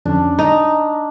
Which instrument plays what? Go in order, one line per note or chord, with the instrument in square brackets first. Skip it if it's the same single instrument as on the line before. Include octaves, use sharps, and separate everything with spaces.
[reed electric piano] F2 D3 C#4 [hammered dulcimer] D4
[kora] D#4 [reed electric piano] A#5